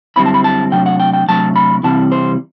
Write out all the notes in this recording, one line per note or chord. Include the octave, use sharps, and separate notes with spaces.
F#2 D3 G3 C4 E4 B5
A5
B5
A5
C3 F#3 A3 D4 G5
F#5
G5
G5
C3 F#3 A3 D4 A5
B5
C3 E3 G3 C4 E4 A5
C5